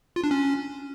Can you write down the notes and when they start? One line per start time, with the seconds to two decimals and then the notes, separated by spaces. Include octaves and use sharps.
0.16 F4
0.24 D4
0.31 C#4